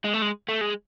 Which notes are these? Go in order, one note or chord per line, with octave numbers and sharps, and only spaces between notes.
G#3
A3
G#3
A3
G#3